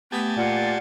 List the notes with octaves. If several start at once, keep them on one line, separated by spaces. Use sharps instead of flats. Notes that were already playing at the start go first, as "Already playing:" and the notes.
A3 B3 G4 G#5 A5
A#2 F4 D5 F#5